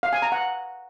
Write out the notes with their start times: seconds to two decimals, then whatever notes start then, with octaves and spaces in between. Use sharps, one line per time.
0.03 F5
0.13 G#5
0.22 A#5
0.32 F#5